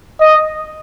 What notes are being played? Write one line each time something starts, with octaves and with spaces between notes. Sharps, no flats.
D#5